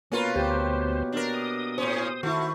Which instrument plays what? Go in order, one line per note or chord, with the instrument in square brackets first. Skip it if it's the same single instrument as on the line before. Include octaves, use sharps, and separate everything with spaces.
[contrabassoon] B2 [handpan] A#3 A#4 B4 [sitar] C#4 F4
[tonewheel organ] D2 C5 [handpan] G4
[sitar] D4 A#4
[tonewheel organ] D#6
[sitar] A2 C#4 [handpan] C5
[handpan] D#3 E4 [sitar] A3 [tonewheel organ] F#4